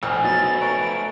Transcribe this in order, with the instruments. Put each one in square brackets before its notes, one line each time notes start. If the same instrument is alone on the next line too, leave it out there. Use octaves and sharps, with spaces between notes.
[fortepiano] A#1 E6 F6 [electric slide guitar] A3 C5 G#5
[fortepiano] F#3 B3 D#4 [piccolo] A6
[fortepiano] B4 C#5 A#5 [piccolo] D7